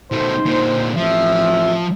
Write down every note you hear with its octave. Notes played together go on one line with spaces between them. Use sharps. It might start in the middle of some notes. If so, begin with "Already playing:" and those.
B2 A3 D#4 C5
A#2 D3
A1 F3 C4 E5